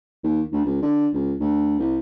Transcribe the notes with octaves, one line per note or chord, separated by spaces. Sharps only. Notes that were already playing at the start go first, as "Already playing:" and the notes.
D#2
D2
C#2
D3
C#2
D2
C2